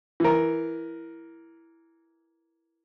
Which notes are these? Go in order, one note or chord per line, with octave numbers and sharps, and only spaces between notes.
E3 A#4